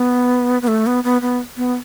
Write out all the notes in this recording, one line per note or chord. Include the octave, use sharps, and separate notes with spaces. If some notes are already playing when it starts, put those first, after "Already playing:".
Already playing: B3
B3
A3
B3
B3
B3
B3